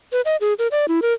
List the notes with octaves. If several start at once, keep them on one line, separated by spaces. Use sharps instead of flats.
B4
D#5
G#4
A#4
D5
E4
A#4